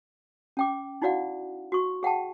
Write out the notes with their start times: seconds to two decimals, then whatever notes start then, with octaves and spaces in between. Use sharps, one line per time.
0.57 C#4 G5 D6
1.02 D#4 E4 F#4 D5 F5 F#5
1.72 F#4 C#6
2.03 G#4 F#5 G5 A5